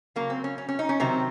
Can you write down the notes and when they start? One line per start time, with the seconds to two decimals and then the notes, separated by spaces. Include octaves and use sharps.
0.16 C#3 F#3 A#3
0.30 C4
0.44 C#4
0.58 C#4
0.69 C#4
0.79 D#4
0.89 C#4
1.00 C3 D#3 F#3 C4